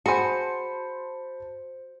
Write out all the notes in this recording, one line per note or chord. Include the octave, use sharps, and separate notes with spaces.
F#4 G#4 C5 G#5 A5 B5 C6 C#7